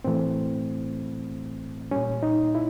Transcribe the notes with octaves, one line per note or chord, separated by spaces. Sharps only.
A2 E3 A3 C4
A#2 G3 C#4
D#4
E4